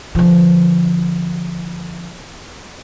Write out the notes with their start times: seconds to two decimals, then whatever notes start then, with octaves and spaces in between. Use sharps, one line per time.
0.15 D3 F3